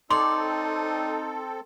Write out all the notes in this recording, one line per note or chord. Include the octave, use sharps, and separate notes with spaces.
C4 D#4 A4 C#5 D5 C6